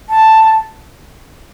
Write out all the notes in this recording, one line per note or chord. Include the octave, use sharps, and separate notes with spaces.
A5